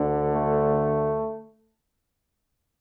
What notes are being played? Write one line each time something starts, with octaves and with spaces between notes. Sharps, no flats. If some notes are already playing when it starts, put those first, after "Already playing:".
Already playing: D2 D3
A3